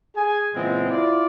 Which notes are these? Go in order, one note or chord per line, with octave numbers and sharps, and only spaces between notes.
G#4 G#5
A#2 C#3 E3 G#3 B3 C4
E4 F4 D5